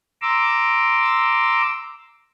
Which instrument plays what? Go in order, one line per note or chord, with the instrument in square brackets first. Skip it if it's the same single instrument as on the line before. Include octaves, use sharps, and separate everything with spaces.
[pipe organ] A#5 C6 D6 E6